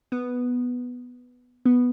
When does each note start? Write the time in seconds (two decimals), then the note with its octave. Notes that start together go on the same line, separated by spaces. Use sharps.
0.12 B3
1.66 B3